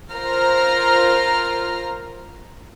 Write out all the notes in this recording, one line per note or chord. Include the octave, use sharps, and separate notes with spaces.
F4 A#4 C5 A#5 F6